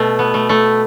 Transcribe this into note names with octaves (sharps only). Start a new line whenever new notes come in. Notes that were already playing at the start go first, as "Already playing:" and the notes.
Already playing: B2 A3
B3
A3
A3